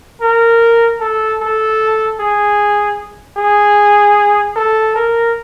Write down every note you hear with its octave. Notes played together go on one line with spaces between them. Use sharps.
A#4
A4
A4
G#4
G#4
A4
A#4